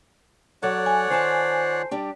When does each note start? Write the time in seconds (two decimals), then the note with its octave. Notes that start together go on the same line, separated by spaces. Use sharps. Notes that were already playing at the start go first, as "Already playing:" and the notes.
0.63 F#3 A4 C#5 D5 F#5
0.86 G#5
1.10 D#3 F4 C5 A5
1.91 G3 D4 G4